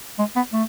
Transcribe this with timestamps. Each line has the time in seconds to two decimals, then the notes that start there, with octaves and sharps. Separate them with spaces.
0.19 G#3
0.36 B3
0.53 A3